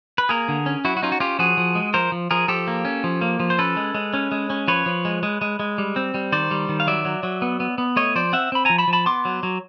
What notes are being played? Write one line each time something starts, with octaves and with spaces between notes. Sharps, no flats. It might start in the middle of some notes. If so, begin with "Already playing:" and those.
B4
A#3 G#4 A#4
D3
C#4
F#3 E4 F#4
F#4
C#4 D#4 F4
F#4
C#4 F4 G4
F3 F#4 G#4
F3
G#3
F3 A#4 C5
F3
F3 G#4 A#4
F3 G4 A4
A#3
C#4
F3
A#3
F3
C5
C#4 A4 B4
G#3
G#3
C#4
G#3
C#4
F3 B4 C#5
F3
G#3
G#3
G#3
G#3
G3
C4
G3
D#3 C5 D5
G3
D#3
F5
F#3 D5 E5
F#3
F#3
B3
B3
B3
A3 C#5 D#5
F3 C5 D5
C4 E5 F#5
C4 B5
F3 G#5 A#5
A5 B5
F3
A5 B5
B3 C6 D6
F#3
F#3